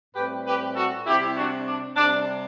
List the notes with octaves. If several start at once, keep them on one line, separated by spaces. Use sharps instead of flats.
A2 G3 C4 G4 B4
G4 B4
F#4 A4
C3 G3 C4 E4 G4
D4 F#4
D4
C3 G3 C4 D4